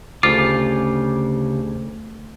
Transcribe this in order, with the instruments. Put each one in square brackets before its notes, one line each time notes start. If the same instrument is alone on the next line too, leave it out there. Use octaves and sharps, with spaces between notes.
[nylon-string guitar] D2 [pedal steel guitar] C#3 G4 D6 [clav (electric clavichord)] F4